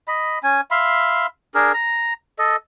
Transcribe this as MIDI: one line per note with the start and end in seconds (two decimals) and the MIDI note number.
0.08 0.39 75
0.08 0.39 83
0.43 0.61 61
0.43 0.61 80
0.71 1.27 76
0.71 1.27 77
0.71 1.27 83
0.71 1.27 84
1.55 1.72 62
1.55 1.72 68
1.55 1.72 70
1.74 2.13 82
2.39 2.56 69
2.39 2.56 75